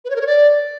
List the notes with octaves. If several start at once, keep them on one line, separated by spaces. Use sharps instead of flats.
B4
C#5
A#4
C#5
D5